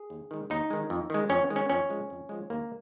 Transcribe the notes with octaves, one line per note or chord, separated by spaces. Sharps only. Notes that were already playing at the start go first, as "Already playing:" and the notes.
Already playing: G#4
D#2
D#3 G#3
D#2 D#4
D#3 G#3
F2
D#3 G#3
F2 C#4
D#3 G#3
C#4
F2 C#4
F3 G#3
F2
F3 G#3
D#2 A#3